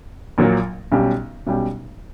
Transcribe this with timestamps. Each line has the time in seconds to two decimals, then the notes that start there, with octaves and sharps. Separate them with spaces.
0.38 A#1 A#2 F#3 A#3
0.92 B1 B2 G3 C#4 G4
1.47 B1 B2 G3 C#4 G4